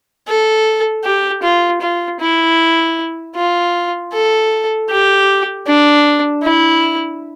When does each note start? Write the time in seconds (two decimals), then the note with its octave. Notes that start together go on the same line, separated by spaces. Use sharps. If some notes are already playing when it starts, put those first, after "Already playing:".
0.28 A4
1.04 G4
1.43 F4
1.81 F4
2.20 E4
3.35 F4
4.13 A4
4.89 G4
5.67 D4
6.43 E4